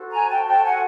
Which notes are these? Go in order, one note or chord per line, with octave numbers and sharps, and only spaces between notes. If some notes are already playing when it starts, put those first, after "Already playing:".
Already playing: F#4 A4 C5
G#5 A#5
G5 A5
G5 A5
F#5 G#5